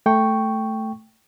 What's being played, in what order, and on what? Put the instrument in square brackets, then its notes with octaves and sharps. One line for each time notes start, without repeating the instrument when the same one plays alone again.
[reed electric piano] A3 G5 C#6